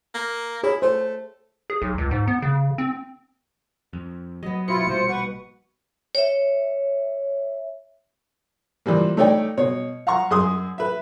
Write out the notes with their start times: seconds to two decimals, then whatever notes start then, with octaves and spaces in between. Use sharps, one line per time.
0.14 A#3
0.63 E4 G#4 C#5
0.82 A3 C5
1.70 G#4
1.82 B1
1.98 C#2
2.11 G#2
2.28 B3
2.42 C#3
2.78 C4
3.93 F2
4.43 F#3 B3 D#5
4.68 B2 E4 F4 C#7
4.87 A#1 G3 A#3 F4 C5
5.09 B4 F#5 C#6
6.15 C#5 E5
8.86 E3 F3 G3 A#3
9.17 A3 D#4 C#5 D5 G5
9.57 B2 C#5
10.07 F5 F#5 A#5 C#6
10.31 F#2 G#4 C6 D#6
10.78 B4 E5